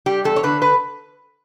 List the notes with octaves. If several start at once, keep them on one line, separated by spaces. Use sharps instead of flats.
G3 G4
E2 A4
C#5
D3 B4
B4